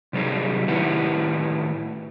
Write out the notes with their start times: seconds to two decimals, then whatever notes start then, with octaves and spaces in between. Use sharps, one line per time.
0.13 C3 F#3 G3 D#4 G#4
0.68 A2 D#3 E4 G4 B4 F#5